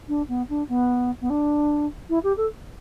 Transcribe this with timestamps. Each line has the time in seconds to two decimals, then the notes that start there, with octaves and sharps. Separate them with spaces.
0.08 D4
0.28 B3
0.49 D4
0.68 B3
1.21 B3
1.30 D4
2.09 E4
2.23 G4
2.37 A4